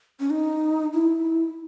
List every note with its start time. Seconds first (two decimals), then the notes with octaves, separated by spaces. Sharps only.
0.20 C#4
0.30 D#4
0.93 E4